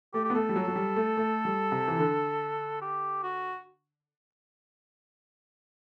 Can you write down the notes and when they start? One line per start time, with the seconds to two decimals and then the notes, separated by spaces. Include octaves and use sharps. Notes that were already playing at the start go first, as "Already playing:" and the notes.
0.14 A3 G4
0.25 G4
0.30 B3
0.35 A3 A4
0.49 G3
0.56 F#3
0.68 F#3
0.76 G3
0.96 A3
1.17 A3
1.45 G3
1.72 C3
1.88 E3
1.99 D3
2.82 G4
3.23 F#4